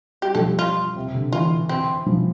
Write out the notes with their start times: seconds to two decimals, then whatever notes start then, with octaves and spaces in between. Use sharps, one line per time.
0.22 G3 G4
0.35 F3 A4
0.49 G3
0.59 F4
0.96 C3
1.15 D3
1.33 E3 F4
1.69 C4
2.06 F3